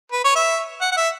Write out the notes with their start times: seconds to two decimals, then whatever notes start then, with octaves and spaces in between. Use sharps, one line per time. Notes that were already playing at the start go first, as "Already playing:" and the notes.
0.12 B4
0.24 C#5
0.36 E5
0.81 F#5
0.92 F#5
0.96 E5